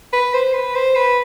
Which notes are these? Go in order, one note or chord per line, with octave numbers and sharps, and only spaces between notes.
B4
C5
B4
C5
B4